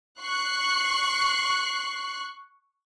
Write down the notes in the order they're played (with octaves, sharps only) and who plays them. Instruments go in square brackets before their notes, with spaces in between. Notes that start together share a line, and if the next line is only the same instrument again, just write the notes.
[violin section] C#6 F#6 C7